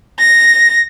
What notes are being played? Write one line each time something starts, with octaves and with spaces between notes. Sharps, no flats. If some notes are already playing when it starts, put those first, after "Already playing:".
A#6